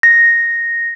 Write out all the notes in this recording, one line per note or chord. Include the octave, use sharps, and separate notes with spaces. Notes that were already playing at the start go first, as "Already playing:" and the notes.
A#6